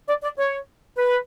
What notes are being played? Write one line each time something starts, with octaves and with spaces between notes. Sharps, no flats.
D5
D5
C#5
B4